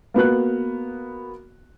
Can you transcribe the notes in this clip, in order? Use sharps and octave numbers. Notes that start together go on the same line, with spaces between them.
A#3 B3 F#4 F#6